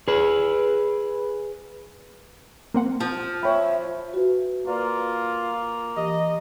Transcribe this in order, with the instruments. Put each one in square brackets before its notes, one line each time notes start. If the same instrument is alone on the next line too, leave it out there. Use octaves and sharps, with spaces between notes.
[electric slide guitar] G#4 B4
[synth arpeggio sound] A#3 C4 F#5
[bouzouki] F3
[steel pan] C#5 G5 B5 [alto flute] E5
[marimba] F#4 B4
[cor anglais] A#3 [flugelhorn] F4 [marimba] B4 D5
[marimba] E3 G4 [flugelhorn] D#5